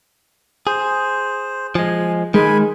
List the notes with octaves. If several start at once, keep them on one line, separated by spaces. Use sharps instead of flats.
G#4 C5
F3 G#3 G#5
D#3 G#3 G#5 B5